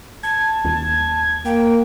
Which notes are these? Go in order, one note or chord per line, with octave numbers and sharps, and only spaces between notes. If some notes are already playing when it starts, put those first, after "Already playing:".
A5 G#6
D#2
A#3 G5